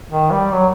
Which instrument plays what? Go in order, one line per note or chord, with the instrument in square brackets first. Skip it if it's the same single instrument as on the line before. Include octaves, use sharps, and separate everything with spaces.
[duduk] D#3
G3
F#3